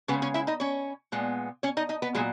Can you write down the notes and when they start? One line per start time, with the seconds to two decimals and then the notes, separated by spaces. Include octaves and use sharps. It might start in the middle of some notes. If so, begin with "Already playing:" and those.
0.08 C#3 G#3 B3 C#4 B4
0.22 C#4 C#5
0.34 E4 E5
0.47 D#4 D#5
0.60 C#4 C#5
1.12 A#2 G#3 B3
1.63 C#4 C#5
1.77 D#4 D#5
1.89 D#4 D#5
2.02 B3 B4
2.15 A#2 F#3 G#3 G#4